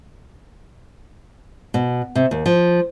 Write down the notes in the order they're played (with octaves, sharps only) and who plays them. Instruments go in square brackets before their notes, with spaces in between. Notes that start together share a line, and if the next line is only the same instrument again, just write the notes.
[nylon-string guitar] B2
C3
D#2
F3